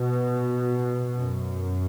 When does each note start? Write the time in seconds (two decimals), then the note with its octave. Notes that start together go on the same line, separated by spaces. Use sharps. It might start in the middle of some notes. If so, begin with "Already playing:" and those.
Already playing: B2
1.15 F#2